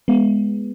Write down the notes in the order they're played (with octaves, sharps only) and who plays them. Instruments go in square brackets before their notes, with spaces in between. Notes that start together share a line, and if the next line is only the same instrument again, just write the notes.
[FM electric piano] G#3 B3